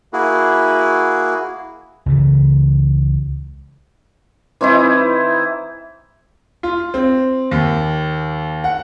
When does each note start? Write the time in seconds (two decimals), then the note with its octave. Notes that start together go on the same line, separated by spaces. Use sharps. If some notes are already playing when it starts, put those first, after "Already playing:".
0.13 A#3 E4 F#4 G#4
2.06 C#2 C#3 E3
4.61 E3 C4 D#4 E4
6.63 F4
6.94 C4
7.51 D#2
8.64 F#5